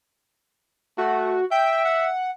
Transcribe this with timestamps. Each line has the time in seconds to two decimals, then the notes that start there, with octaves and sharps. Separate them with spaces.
0.98 A3 F#4
1.51 E5 G5
1.85 F#5